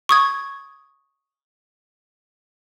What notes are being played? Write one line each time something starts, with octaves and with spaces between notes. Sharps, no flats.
C#6 D#6 G#6